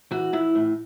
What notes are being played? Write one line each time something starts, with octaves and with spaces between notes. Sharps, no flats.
E3 F#4
E3 E4
A2